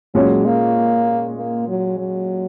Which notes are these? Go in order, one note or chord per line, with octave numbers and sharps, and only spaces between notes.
A#2 F#3 G#3 C#4 G#4 C#5
A#3
A#3
F#3
F#3